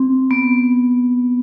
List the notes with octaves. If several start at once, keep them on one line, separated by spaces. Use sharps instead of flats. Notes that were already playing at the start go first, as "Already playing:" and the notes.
Already playing: C4
B3